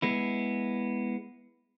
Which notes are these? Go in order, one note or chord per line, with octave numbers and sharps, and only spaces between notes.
G#3 B3 E4